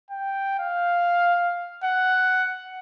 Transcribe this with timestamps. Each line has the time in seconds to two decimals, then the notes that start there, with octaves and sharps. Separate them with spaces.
0.11 G5
0.60 F5
1.84 F#5